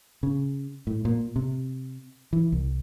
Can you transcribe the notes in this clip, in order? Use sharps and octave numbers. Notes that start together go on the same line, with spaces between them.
C#3
A2
A#2
C3
E3
C2